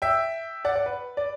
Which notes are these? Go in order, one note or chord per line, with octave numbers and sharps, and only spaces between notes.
E5 G5
D5 F#5
D5 F#5
B4
D5